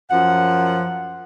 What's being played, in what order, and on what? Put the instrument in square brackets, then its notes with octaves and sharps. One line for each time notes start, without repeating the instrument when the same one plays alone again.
[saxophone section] F#2 F3 F#5